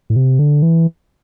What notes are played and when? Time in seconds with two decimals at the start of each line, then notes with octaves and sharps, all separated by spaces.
0.10 A2
0.16 C3
0.39 D3
0.62 E3